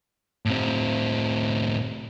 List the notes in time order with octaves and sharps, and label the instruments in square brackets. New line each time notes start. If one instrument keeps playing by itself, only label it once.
[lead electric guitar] A2 C4